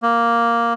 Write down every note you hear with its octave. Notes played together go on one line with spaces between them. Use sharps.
A#3